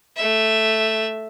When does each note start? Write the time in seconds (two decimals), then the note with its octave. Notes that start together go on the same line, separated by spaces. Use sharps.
0.16 A3 E5